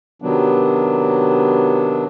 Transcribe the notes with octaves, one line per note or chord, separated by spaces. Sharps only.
C3 D#3 F#3 B3 D4